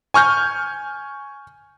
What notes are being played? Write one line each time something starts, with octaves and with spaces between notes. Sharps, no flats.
G#5 C#6 F6 G6